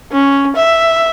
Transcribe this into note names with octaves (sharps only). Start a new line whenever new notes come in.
C#4
E5